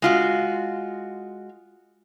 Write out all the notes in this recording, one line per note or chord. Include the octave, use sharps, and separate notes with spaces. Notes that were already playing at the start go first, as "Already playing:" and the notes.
G#3 F4 F#4